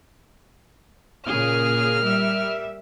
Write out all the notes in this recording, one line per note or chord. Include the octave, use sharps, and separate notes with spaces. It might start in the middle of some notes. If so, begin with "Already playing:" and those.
A#2 C#3 G#4 A#4 F6
G3 E5